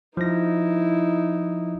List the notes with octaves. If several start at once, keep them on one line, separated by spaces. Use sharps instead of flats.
F3 D#4 E4 A#6